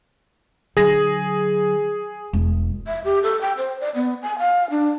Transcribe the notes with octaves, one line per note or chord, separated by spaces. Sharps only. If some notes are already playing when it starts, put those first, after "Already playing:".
D3 F#3 G#4 A#6
E1
E5
G4
A4
G5
C5
D5
B3
G#5
F5
D4